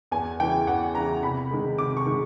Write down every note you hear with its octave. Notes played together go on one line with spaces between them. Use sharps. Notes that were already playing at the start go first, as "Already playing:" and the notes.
E2 G#5
C#3 E3 G5
E2 F#5
C#3 E3 A#5
C3 B5
D#3 G#3
C3 D6
C#6
D#3 G#3